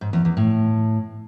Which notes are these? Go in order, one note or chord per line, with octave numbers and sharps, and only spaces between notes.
G#2
E2
E2
A2